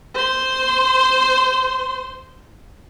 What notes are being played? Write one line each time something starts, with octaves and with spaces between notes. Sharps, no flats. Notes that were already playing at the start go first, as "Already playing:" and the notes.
C5 C6